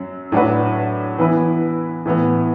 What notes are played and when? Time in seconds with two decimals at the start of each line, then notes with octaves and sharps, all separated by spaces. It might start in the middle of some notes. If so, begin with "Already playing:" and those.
Already playing: F#2 F#3
0.32 A2 F#3 D4 F#4 B4
1.18 E3 B3 E4 B4
2.05 A2 E3 B3